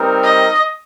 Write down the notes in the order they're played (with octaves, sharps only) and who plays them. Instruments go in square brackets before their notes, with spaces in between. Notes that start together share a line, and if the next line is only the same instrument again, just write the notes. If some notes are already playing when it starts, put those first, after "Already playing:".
Already playing: [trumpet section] G3 C4 D#4 A#4
[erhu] D#5